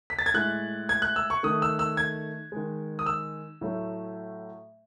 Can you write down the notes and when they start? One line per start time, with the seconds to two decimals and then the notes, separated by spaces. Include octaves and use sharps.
0.10 B6
0.19 A6
0.26 G#6
0.34 A2 G#3 F#6
0.89 G#6
1.02 F#6
1.16 E6
1.30 C#6
1.43 D#3 A3 D#6
1.62 E6
1.79 E6
1.97 G#6
2.52 D#3 G#3
2.99 D#6
3.06 E6
3.61 A2 F#3 A3